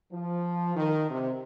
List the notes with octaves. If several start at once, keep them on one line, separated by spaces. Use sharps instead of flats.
F3
D#3
C3